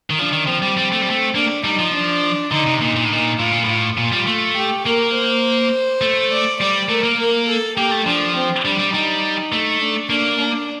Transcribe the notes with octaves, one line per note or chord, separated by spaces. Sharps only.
D#3
F3 D4
D#3
F3 C4
G3
G3
A3
G3
A3
A#3 D4
G3 D#4
F3
D4
D3 D#4
C3
A#2 D#4
A#2
A2
A#2 D#4
A2 F4
A#2
A2 F4
A#2 F4
G3
A3
G4
A#3 A#4
C5
A3
D5
G3 D5
A3 A#4
A#3
A#4
A4
A#3 G4
A3
F3 D4
C4
G3 D4
G3
G3 D#4
A3
D4
A#3 D4
D4